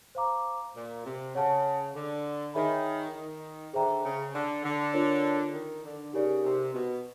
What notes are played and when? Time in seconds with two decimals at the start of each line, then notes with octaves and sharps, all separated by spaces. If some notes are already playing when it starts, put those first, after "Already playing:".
0.15 C5 F5 A#5 D6
0.75 A#2
1.05 C3
1.35 C#3 C#5 F#5 A5
1.94 D3
2.54 D#3 G#4 C#5 E5 G#5 B5
3.15 D#3
3.74 D3 G#4 C5 E5 G5 A#5
4.04 C#3
4.34 D3
4.63 D3
4.93 D4 F4 A#4 C#5
5.53 D#3
5.83 D3
6.13 C#3 D#4 G4 A#4 D5
6.43 C3
6.73 B2